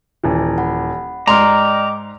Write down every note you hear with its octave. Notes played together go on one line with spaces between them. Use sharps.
D#1 E3
F#5 B5
G#2 D5 D#5 G5 A#5 C6 D6 F6